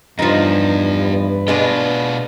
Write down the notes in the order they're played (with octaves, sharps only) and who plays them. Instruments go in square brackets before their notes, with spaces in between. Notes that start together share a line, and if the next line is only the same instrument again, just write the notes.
[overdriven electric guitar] E2 [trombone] G2 [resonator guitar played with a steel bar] F3 D#4
[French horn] B4
[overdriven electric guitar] B2 F4 [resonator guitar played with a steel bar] G#3 B3 D4